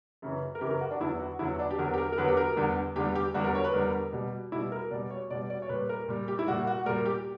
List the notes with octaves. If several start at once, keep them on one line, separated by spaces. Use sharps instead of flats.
F#2 C#3 E3
A#4
F#2 C#3 E3 G4
A#4
F#4
D4
E2 D3 F#3 E4
F#4
E2 D3 F#3 E4
D4
G4
E2 D3 F#3 A#4
G4
A#4
A#4
E2 D3 F#3 B4
G4
A#4
E2 D3 G3
E2 D3 G3 G4
G4
E2 D3 G3 F#4
A#4
C#5
B4
E2 D3 G3 A#4
B2 G3
B2 G3 E4
A#4
B2 G3 D5
C#5
B2 G3 D5
D5
C#5
A#2 G3 B4
A#4
A#2 G3
G4
E4
A#2 G3 F#4
F#4
A#2 G3 A#4
G4